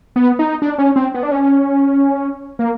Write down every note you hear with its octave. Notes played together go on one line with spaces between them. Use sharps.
B3
D#4
D4
C#4
C4
B3
D4
C#4
A#3